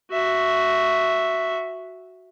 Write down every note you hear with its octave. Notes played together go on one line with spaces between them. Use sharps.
F#4 E5